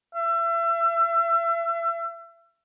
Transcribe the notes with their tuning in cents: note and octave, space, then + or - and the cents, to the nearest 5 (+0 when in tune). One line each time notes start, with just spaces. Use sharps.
E5 +35